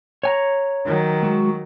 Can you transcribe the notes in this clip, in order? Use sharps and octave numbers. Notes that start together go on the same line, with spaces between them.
C#5 G#5 A#5
D#3 F#3
G#3 F#4